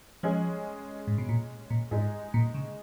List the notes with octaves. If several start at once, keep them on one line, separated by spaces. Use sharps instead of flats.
F3 G#3 C#4 G#4
G#2
B2
A#2
A#2
G#2 G#3 D#4 G#4
A#2
C#3